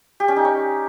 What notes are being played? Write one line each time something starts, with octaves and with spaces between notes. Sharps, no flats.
G4
C#4
D#4
C#5